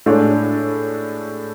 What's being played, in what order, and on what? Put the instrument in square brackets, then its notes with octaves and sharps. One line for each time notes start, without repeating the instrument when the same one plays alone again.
[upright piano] A2 G#3 D4 A4 C#5